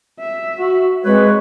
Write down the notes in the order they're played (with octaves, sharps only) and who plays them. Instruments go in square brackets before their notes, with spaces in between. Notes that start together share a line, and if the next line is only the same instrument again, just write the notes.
[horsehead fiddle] E5
[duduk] F#4
[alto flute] G#3 [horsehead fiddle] C4 [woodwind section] B4 [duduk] C#5